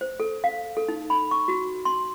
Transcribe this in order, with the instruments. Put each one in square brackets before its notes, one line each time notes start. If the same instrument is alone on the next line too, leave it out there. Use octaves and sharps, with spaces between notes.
[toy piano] C5
A4
F5
A4
D#4
B5
C#6
F#4
C6